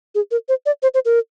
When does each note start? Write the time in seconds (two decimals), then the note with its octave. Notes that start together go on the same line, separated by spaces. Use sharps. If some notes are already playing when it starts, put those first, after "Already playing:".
0.15 G#4
0.31 A#4
0.49 C5
0.66 D5
0.83 C5
0.94 C5
1.05 A#4